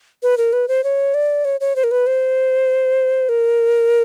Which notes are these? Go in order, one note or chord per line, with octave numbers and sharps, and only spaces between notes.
B4
A#4
B4
C5
C#5
D5
C#5
C#5
C5
A#4
B4
C5
A#4